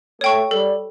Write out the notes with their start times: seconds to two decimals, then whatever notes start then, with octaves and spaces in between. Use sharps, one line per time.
0.21 A3 C#5 G5 C#6
0.51 G3 A4